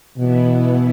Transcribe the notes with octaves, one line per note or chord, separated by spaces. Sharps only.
B2 E3 B3 E4